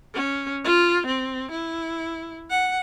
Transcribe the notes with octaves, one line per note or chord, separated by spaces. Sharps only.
C#4
F4
C4
E4
F#5